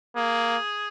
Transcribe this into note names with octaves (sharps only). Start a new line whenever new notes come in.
A#3 G#4